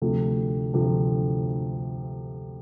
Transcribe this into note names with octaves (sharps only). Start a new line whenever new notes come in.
D2 C3 F3 A3
D2 C3 F3 A3